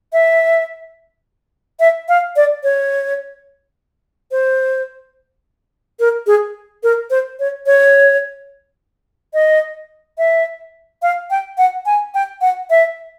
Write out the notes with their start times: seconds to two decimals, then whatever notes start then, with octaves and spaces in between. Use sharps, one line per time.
0.13 E5
1.80 E5
2.09 F5
2.36 D5
2.63 C#5
4.31 C5
6.00 A#4
6.27 G#4
6.83 A#4
7.10 C5
7.39 C#5
7.66 C#5
9.34 D#5
10.18 E5
11.02 F5
11.30 G5
11.58 F#5
11.86 G#5
12.14 G5
12.41 F#5
12.70 E5